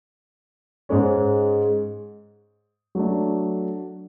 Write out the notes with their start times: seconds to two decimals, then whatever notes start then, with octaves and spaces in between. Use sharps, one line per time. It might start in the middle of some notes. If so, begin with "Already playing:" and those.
0.89 G#2 G#3 C#4
2.95 F#3 A3 D4